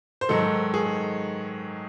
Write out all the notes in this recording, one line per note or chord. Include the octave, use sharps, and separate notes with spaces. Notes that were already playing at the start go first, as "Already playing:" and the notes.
C5
G#2 D#3 F#3 A4
G#4